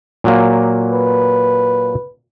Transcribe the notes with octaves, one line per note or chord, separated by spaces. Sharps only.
A#2 F#3 A#3
B4